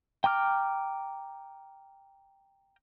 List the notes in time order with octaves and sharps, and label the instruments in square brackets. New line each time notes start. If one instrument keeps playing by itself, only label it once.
[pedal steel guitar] G5 A#5 D6 F6